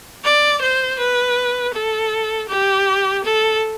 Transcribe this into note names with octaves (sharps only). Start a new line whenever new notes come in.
D5
C5
B4
A4
G4
A4